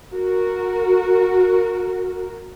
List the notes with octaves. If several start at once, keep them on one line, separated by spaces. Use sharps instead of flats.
F#4 A#4